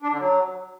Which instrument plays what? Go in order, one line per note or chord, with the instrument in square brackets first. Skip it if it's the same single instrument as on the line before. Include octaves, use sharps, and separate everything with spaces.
[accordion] D4
D3
F#3